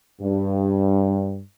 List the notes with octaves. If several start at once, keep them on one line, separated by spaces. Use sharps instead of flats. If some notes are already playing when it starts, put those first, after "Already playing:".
G2